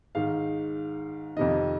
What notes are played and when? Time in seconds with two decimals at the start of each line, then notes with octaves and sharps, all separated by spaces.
0.15 G#2 D#3 F5
1.37 F2 C3 D#3 D#5